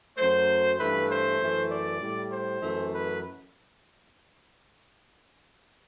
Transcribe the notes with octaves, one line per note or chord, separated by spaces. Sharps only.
F#2 F#3 A3 C5
G2 E3 A3 B4
C5
F#2 E3 A3
D5
A2 G3
C5
F#2 E3 A3
B4